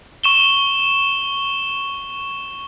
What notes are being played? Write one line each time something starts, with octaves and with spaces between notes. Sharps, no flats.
C#6 E7 G7